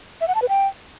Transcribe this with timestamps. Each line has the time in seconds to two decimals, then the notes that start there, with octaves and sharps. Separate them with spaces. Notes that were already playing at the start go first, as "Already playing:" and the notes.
0.21 E5
0.28 F#5
0.35 A5
0.42 B4
0.49 G5